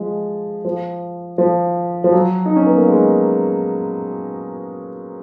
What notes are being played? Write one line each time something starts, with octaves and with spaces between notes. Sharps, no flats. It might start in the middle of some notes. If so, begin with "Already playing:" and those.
Already playing: F3 G#3
F3
F3
F3
F#3
D#4
C#4
B3
A#3
G#3